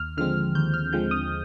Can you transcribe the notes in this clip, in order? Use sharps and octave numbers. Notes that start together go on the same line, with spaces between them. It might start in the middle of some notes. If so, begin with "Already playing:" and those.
Already playing: D#2 F6
D3 F3 G#3 C4 F6
D#2 G6
F6
D3 F3 G#3 C4 G6
D#6